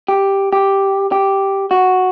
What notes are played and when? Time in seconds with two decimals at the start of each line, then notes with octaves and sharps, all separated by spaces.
0.08 G4
0.53 G4
1.12 G4
1.71 F#4